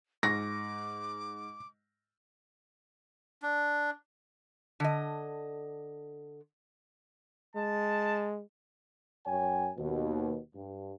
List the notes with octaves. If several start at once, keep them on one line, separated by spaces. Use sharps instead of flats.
G#2 C#6 D6 A#6
D4
D3 D#5
G#3 A5
F#2 C#5 G5 G#5
D#2 B2
G2